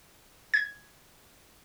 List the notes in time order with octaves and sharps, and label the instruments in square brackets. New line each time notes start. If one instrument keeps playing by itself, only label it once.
[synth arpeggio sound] G#6